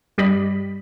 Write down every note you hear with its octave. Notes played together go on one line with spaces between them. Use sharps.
G2 G3 D5 D#5 B5